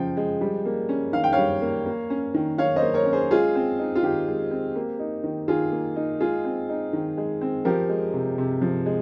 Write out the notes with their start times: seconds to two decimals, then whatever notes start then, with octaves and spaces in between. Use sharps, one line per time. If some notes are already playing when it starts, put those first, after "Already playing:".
Already playing: C#3 F3 G#3 G5
0.17 G#3
0.41 G3
0.66 A#3
0.89 C#4
1.13 D#3 F5
1.24 G5
1.33 C#5 F5
1.38 G3
1.62 A#3
1.86 A#3
2.10 C#4
2.34 D#3
2.58 D#3 C#5 F5
2.76 C5 D#5
2.82 A#3
2.94 A#4 C#5
3.06 C#4
3.13 G#4 C5
3.31 G#3 F4 G#4
3.55 C4
3.79 D#4
3.95 F4
4.03 D#3 G4
4.28 G#3
4.51 C4
4.76 A#3
4.99 D#4
5.24 D#3
5.48 D#3 F4 G#4
5.72 A#3
5.96 D#4
6.20 G#3 F4 G#4
6.45 C4
6.69 D#4
6.93 D#3
7.17 G#3
7.41 C4
7.65 F3 G4 A#4
7.89 G#3
8.13 C3
8.38 C3
8.61 F3
8.86 G#3